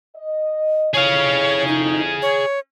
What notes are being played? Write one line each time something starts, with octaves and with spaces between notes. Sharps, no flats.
D#5
F2 E4 G#4 C#5 F5
D#4
C#5